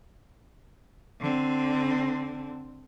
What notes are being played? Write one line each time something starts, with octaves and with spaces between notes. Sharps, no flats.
D3 C4